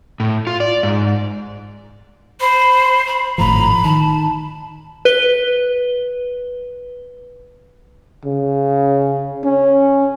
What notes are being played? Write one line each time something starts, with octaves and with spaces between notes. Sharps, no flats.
A2
F4
D5
G#2
C5 B5
B5
G#1 A2 F3 A#5 B5
D#3 A5
B4 G7
C#3
C#4